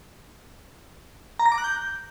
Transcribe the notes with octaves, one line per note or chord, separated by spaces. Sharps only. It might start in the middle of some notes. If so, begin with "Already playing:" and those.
A#5
A#6
D6
F#6
G6